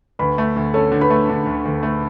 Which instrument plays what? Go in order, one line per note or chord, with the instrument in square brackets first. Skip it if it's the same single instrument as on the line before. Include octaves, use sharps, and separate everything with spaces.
[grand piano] D2 [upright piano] B4 B5
[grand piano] A3
D2
[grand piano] C#4 [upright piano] A4 A5
[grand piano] D3
[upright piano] B4 B5
[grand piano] A3
D3
D2
D2
A3